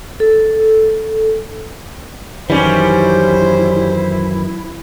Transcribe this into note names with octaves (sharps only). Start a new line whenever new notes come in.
A4
F#2 D#3 E3 G3 C#4 E4 C5